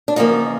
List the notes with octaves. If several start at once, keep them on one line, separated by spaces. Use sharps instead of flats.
D4
E2 C#3 F3 A#3 D#4